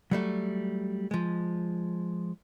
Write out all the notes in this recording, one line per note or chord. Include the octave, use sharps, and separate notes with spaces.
F#3 G3 A3
F3 G#3